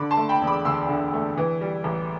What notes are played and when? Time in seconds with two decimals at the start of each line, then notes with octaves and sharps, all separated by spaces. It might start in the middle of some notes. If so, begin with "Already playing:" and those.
Already playing: D3 B5 D6
0.11 A5 C6
0.17 A3
0.29 G5 B5
0.41 E1
0.47 B5 D6
0.65 D2 C6 E6
0.89 D3
1.14 A3
1.37 E3
1.61 G3
1.84 A1